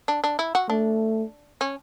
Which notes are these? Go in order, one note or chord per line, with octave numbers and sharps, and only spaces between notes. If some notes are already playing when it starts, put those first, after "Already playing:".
D4
D4
E4
F#4
A3 D4
C#4